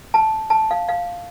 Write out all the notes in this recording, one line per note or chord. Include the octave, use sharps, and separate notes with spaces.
A5
A5
F5
F5